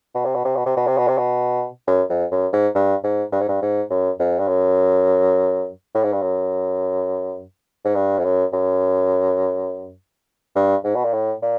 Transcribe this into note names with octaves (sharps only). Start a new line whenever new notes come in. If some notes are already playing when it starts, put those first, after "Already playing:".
B2
C3
B2
C3
B2
C3
B2
C3
B2
C3
B2
F#2
F2
F#2
G#2
G2
G#2
G2
G#2
G2
G#2
F#2
F2
G2
F#2
A2
G#2
G2
F#2
G#2
G2
F2
F#2
F#2
G2
G#2
B2
A#2
A2
A#2